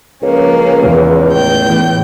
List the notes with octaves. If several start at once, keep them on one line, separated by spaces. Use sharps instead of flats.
C#2 F3 A#3 C#4
E2
A2 G5 G6
A1 E2 E3